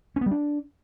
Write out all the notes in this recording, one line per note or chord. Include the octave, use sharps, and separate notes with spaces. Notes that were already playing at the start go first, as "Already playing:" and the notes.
C#4
B3
G3
D4